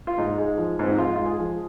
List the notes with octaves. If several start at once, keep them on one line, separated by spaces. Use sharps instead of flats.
F4
G#2 D#4
G#3
F3
G#2 C4
D#4
G#2 F4
G#3 F4
G#4
F3